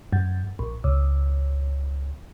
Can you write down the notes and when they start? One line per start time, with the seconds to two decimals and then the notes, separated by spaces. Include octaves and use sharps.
0.13 F#2
0.59 A#1
0.84 C#2